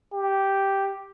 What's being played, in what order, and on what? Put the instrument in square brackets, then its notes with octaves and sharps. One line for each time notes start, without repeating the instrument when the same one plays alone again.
[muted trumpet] G4